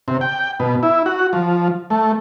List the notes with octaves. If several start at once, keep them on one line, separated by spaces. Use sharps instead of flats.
C3
G5
B2
E4
F#4
F3
A3